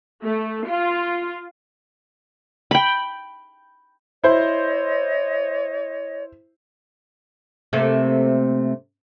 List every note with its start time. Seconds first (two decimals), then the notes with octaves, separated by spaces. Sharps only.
0.24 A3
0.67 F4
2.71 G5 B5
4.24 E4 C5 C#5 D#5
7.73 C3 A3 A#3